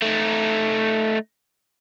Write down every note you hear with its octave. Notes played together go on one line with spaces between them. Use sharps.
A3 D#4